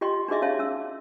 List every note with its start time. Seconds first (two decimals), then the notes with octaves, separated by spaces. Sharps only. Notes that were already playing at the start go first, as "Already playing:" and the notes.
0.01 F4 G4 D#5 G5 C6
0.28 D4 D#4 F#4 G#4 D#5 E5
0.42 C#4 C#5 E5 F5 A5
0.59 C#4 E6